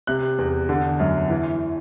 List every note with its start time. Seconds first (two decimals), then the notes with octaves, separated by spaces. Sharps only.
0.07 C3 F#6
0.38 E2
0.69 D3
1.00 F#2
1.30 E3